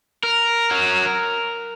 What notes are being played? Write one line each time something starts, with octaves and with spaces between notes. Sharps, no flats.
A#4
F#3